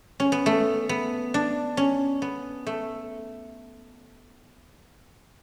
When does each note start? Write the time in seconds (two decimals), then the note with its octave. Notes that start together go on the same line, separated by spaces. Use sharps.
0.20 C#4
0.32 B3
0.46 A3
0.89 B3
1.34 D4
1.77 C#4
2.22 B3
2.67 A3